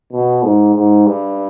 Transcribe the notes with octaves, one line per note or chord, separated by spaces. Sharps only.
B2
G#2
G#2
G2